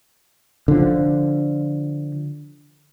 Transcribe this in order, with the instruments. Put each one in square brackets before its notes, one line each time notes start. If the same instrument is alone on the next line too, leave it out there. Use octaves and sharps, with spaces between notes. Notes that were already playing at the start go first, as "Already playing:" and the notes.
[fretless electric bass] D3 F3